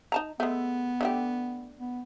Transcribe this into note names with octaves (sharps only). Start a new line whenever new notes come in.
D#4 A5 A#5
G#3 A3 B3
D3 A3 G4
B3